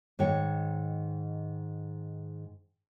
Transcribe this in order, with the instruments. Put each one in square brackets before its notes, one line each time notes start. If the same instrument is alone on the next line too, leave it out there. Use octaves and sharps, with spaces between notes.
[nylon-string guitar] G#2 D#3 C#5 G5